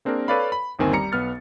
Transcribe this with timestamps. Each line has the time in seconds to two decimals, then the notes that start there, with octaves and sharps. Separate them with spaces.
0.05 A#3 C4 D4 G#4 A#4
0.28 A4 B4 C#5 D5 F5 B5
0.52 B5
0.79 G1 D#2 D#3 C4 G#5
0.93 G3 A#5 C#7
1.12 B1 B3 F6 A6